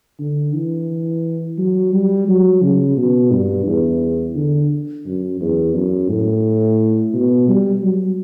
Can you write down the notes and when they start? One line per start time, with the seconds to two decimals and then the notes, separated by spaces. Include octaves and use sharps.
0.20 D3
0.54 E3
1.58 F#3
1.93 G3
2.28 F#3
2.62 C#3
2.97 B2
3.31 G2
3.66 E2
4.36 D3
5.06 F#2
5.41 E2
5.76 F#2
6.09 A2
7.13 B2
7.48 G3
7.83 F#3